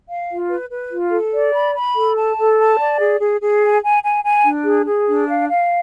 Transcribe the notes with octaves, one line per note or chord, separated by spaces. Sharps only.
F5
F4
B4
B4
F4
A4
D5
B5
B5
A4
A5
A4
A5
D5
G#4
G#4
G#4
G#5
G#5
G#5
G#5
D4
G#4
G#4
D4
F5
F5